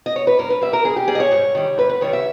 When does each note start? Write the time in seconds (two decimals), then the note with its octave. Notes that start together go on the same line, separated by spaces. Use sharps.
0.06 D#5
0.16 C#5
0.27 B4
0.39 G2 A#4
0.50 B4
0.62 G3 E5
0.73 A#4
0.84 G2 G#4
0.96 G4
1.08 G3 G#4
1.15 D#5
1.20 C#5
1.32 G#2
1.55 D#3 G3
1.78 G#2 B4
1.89 B4
2.01 D#3 G3 C#5
2.13 E5